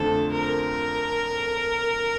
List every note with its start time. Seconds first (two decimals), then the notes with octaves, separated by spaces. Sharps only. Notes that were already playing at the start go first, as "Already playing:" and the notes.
Already playing: F2 D3 A3 C4 A4
0.32 A#4